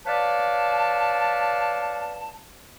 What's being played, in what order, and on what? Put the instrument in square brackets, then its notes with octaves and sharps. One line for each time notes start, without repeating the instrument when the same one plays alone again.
[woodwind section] B4 C#5 D5 F5 A5